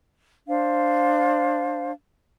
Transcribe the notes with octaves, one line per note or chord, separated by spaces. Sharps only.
D4 C5 F5